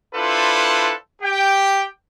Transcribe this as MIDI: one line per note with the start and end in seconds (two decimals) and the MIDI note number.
0.15 0.93 62
0.15 0.93 64
0.15 0.93 65
0.15 0.93 69
0.15 0.93 71
0.15 0.93 72
1.22 1.86 67
1.22 1.86 79